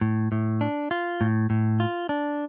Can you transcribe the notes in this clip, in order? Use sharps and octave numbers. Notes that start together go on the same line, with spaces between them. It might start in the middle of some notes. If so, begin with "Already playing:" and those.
A2
A2
D4
F4
A2
A2
F4
D4